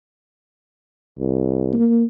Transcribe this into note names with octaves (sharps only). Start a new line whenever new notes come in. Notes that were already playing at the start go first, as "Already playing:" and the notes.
C2
A#3